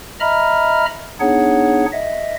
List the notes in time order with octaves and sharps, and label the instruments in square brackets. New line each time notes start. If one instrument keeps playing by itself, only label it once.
[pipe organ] D#5 E5 A#5 B5 F6
B3 D4 D#4 G#4 C#5 F#5
D#5 E5